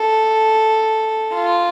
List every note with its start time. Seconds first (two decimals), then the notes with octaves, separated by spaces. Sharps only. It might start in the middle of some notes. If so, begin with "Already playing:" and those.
Already playing: A4
1.34 F4